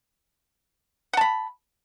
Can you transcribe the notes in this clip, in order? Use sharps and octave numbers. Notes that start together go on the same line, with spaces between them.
F#5 A5 B5